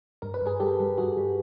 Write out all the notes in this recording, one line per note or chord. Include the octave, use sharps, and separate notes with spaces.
G2 A#4
B4
G2 G#4 A#4
G3 G4 A4
G3
G2 F#4 G#4
G3